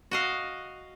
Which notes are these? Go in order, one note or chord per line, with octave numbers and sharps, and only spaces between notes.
F#4 D#5 F5